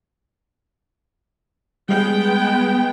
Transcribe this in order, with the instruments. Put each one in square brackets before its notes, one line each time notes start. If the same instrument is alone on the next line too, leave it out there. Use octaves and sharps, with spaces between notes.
[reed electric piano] G3 [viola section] G#3 B3 G5